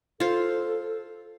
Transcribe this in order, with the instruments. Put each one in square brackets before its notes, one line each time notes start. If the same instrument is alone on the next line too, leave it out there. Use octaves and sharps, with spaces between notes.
[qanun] F4 C5 [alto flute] A4